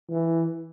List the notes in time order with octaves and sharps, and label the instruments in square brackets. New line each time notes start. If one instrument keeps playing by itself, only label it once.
[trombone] E3